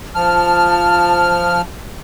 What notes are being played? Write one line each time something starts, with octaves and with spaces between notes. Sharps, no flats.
F3 A5 F6